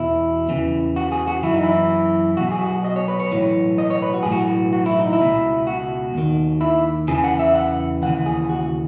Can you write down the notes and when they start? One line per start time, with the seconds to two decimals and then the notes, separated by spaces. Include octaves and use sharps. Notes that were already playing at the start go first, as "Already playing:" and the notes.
Already playing: E2 B2 E4
0.49 E2 C#3 E3
0.96 F#4
1.12 G#4
1.28 F#4
1.43 F#2 E3 E4
1.53 D#4
1.64 E4
2.37 B1 B2 F#4
2.51 G#4
2.61 F#4
2.84 D#5
2.96 C#5
3.08 B4
3.20 C#5
3.32 B1 A2 E3
3.78 D#5
3.90 C#5
4.02 B4
4.14 F#4
4.23 B1 A2 E3 G#4
4.32 F#4
4.73 F#4
4.86 E4
4.99 D#4
5.13 E4
5.19 C#2 B2
5.67 F#4
6.14 D#2 D#3
6.61 E4
7.08 E2 C#3 E3 G#4
7.18 G#5
7.24 F#5
7.39 E5
7.55 F#5
8.02 D#2 C#3 E3 F#5
8.26 G#4
8.49 F#4